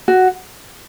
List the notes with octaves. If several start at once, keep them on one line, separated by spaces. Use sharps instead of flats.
F#4